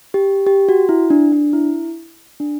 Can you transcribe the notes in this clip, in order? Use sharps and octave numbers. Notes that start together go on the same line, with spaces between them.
G4
G4
F#4
E4
D4
D4
E4
D4